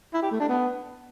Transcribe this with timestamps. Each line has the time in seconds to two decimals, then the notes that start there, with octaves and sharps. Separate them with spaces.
0.14 E4
0.22 G4
0.31 A3
0.40 D4
0.49 B3